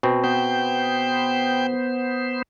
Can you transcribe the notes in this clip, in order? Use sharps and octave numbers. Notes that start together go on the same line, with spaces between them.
B2 C4
B3 C5 G5